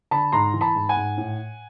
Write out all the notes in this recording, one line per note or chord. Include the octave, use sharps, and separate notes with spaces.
D3 A5 B5
G#2 A#5 C6
E3
A5 B5
G#2
F#5 G#5
G#2
A2